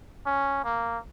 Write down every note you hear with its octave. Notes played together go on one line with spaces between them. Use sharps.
C#4
A#3